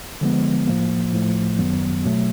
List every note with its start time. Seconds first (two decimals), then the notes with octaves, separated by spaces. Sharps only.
0.21 D3 F3 G#3 B3
0.67 A2 F3 A#3
1.13 A2 F3 A3
1.59 F#2 D#3 F#3 B3
2.05 B2 F#3 A3